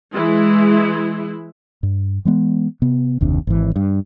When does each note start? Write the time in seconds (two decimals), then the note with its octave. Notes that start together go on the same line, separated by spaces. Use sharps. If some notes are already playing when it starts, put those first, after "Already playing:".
0.13 E3 G#3 E4
1.83 G2
2.25 E3 G#3 B3
2.82 C3 B3
3.21 F#1 D#2 C3 D4
3.47 G#1 E3
3.76 G2